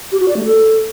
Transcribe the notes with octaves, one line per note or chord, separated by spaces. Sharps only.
G4
F#4
D5
A3
A4